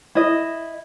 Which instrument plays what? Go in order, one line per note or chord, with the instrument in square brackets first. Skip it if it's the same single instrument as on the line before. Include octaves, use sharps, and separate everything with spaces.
[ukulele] E4 D#5